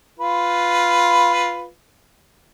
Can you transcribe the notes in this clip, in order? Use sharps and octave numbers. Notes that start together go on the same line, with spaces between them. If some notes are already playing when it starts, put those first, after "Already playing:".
F4 B4